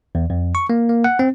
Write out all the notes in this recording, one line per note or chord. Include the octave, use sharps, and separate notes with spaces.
E2
F2
C#6
A#3
A#3
F#5
C4